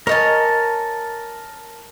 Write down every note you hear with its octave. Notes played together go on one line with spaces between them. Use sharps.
A#4 C#5 D#5 G#5 A5